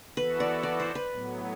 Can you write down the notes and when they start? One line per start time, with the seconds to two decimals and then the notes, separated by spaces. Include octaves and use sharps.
0.16 E3 B3 F#4 A4 B4
0.40 D5
0.63 D5
0.80 C5
0.95 B4
1.10 A2 F#3 B3